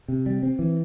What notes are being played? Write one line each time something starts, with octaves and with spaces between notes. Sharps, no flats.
C3
G3
C4
E3